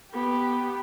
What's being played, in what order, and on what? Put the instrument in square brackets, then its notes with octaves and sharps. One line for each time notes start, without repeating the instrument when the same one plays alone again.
[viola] B3 G4